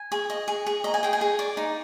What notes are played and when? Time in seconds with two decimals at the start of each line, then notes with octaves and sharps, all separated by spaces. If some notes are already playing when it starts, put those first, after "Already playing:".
Already playing: G#5
0.12 G#4
0.30 D#5
0.48 G#4
0.67 G#4
0.84 D#5 A#5
0.94 G#5
1.03 G#4 G5
1.13 G#5
1.21 G#4
1.39 D5
1.57 D#4